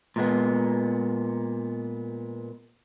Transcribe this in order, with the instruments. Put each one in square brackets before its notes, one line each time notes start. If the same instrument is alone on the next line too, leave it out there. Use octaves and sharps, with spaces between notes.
[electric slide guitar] A#2 G#3 B3